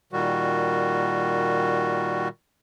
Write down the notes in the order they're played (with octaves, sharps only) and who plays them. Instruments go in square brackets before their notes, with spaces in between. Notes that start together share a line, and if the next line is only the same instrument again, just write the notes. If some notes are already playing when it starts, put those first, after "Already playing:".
[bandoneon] A#2 D#3 G3 F#4